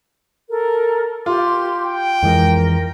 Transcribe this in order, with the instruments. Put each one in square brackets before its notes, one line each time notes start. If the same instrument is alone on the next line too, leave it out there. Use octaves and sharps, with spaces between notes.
[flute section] A4 A#4
[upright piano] F4 [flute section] G4 C6 D6
[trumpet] G5
[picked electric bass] F2 E3 G#3 [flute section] A#4